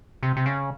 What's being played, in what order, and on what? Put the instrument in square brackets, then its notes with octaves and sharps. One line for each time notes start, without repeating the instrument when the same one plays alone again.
[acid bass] C3
C3
C#3